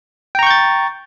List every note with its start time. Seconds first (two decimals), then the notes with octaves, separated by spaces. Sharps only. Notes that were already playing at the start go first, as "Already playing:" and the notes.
0.35 G5
0.39 A#5
0.43 C#6
0.47 G6
0.50 A6